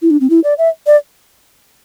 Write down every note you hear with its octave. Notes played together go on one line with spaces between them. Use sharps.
E4
D4
C4
E4
D5
E5
D5